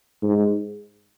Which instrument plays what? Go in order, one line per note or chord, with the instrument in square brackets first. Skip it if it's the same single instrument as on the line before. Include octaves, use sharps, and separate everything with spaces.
[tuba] G#2